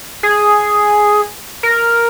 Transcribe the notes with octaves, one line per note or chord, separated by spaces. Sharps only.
G#4
A#4